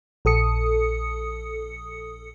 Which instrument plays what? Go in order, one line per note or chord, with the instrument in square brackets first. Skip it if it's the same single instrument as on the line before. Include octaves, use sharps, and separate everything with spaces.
[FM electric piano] A#1 A4 D#6 C#7